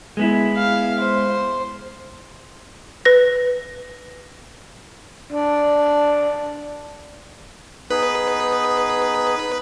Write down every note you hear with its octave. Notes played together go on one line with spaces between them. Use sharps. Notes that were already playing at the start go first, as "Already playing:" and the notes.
G#3 B3 E4
F5
C5
B4 A#6
D4
B3 D#4 G#4 B4